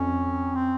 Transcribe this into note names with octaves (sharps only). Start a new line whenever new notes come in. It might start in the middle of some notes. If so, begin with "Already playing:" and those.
Already playing: F2 C#4
C4